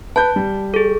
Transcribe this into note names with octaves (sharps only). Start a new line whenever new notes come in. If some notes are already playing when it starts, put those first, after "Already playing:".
B4 A5 G6
G3
G#4 A4